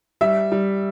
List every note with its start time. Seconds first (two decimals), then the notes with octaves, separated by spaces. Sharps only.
0.21 G3 E5
0.52 G3